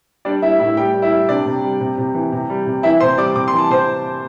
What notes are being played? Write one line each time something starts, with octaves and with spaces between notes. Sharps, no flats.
G3 D4 D5
G3 E4 E5
A2 E4 E5
G3 G4 G5
G3
E4 E5
G3
C3 D4 D5
C3
G3
C3
C3
E3
C3
G3
C3
E3 E4 E5
C3 C5 C6
G3 D5 D6
C3 D6
C6
E3
A5
C3 C5 C6